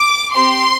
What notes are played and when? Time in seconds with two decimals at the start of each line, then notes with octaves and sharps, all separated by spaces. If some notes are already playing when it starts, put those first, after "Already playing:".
Already playing: D6
0.34 C4 G4 C6